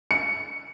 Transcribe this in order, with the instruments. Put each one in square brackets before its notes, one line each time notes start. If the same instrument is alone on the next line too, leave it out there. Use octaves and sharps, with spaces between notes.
[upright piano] C#7